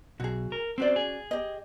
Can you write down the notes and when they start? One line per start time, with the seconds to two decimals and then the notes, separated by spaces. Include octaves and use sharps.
0.20 B1 F#4 G#4
0.52 A#4
0.78 C4 C#4 F#4 C5 D5
0.96 G#4
1.31 G4 D#5